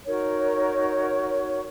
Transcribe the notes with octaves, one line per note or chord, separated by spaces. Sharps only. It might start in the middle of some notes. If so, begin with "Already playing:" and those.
D#4 F#4 A#4 C#5